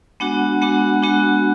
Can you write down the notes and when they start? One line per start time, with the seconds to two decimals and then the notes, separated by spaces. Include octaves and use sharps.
0.20 G#3 B3 D4 F#4 F#5
0.62 G#3 B3 D4 F#4 F#5
1.03 G#3 B3 D4 F#4